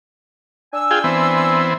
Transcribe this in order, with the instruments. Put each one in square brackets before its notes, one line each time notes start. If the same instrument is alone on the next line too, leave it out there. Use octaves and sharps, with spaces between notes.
[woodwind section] D4 G#5 E6
[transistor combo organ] F4 G#4 G5
E3 B3 C4